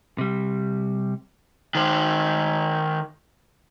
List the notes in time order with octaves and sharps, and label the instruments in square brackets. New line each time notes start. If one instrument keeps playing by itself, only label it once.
[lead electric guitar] C3 G3
D#3 C5